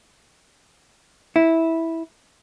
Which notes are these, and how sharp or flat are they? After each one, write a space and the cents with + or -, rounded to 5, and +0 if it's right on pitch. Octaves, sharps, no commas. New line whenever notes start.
E4 -10